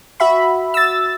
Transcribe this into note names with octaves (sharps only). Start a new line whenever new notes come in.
F#4 E5 B5
E6 A6